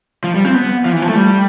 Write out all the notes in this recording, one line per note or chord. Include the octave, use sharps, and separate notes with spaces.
F3
G3
C4
B3
F3
E3
F3
A3
G3